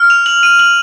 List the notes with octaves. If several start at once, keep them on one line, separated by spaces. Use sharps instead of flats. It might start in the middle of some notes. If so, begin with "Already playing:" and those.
Already playing: F6
F7
F#7
D#7
F#7